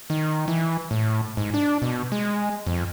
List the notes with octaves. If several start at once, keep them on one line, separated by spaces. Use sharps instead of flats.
D#3
E3
A2
G#2
D4
B2
G#3
F2